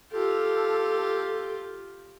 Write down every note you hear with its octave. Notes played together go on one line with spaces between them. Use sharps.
F4 G4 A4